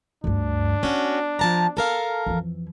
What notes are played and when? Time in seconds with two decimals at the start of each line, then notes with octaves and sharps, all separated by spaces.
0.24 D2 G2 D4
0.83 B3 C#4 F#4
1.39 F3 A5 A#5
1.77 A4 A#4 F5
2.26 F2 E3